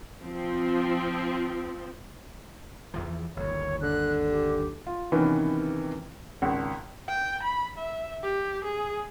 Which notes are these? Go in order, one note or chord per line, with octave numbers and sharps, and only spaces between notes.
F3 C4
E2 E3 F3
G1 D#2 C#5
D3 F#6
G4
F4
C3 D#3 E3 B3 C#4
G#1 C#2
G5
B5
E5
G4
G#4